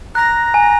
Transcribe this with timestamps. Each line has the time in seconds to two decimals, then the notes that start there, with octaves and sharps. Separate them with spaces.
0.15 A#5 F#6 A#6
0.54 G#5